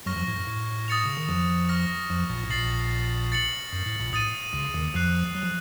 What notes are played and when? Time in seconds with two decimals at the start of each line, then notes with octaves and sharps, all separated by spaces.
0.06 F#2 F#3 C#6 F6 A#6
0.16 F2 F3
0.27 A2
0.37 F#2
0.47 A2
0.88 D#6 A6 C#7 F7
1.06 C#3
1.17 D#3
1.29 F2 F3
1.69 C#6 F6 A#6
2.10 F2 F3
2.30 A#1 A#2
2.44 A2
2.50 A#1 A#2 A6 C7 F#7
3.32 A6 C#7 F#7
3.73 F#2
3.86 A2
4.00 A#1 A#2
4.13 A2 D#6 A6 D#7
4.53 C#2 C#3
4.74 D#2 D#3
4.94 F2 F3 F#6 C7 F7
5.35 F#3
5.43 F3